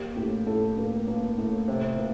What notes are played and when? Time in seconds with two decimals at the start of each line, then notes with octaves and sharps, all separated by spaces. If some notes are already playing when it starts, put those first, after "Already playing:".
Already playing: A#3 G4
0.16 A2 G4
0.46 A2 A4
0.77 A#3
1.07 A#3
1.38 A2
1.68 C3
1.98 A#3